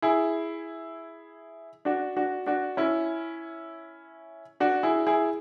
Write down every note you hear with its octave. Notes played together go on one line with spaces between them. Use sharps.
E4 G#4
D4 F#4
D4 F#4
D4 F#4
C#4 E4
D4 F#4
E4 G#4
E4 G#4